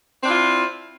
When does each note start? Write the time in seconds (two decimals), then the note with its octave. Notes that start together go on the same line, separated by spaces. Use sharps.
0.22 C4
0.24 D4
0.27 E4
0.29 F4